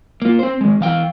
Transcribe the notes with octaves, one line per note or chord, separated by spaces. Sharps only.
A#3 F4
C4 C5
D#3 G#3
E3 F5 G5